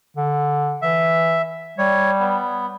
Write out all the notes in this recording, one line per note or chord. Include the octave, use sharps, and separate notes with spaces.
D3
E3 E5
G3 C#5
B3